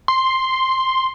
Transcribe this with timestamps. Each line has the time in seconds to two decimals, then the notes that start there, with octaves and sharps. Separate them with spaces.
0.08 C6